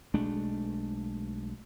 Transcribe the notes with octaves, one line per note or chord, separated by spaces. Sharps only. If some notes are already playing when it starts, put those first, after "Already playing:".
B1 G#3 A3 D4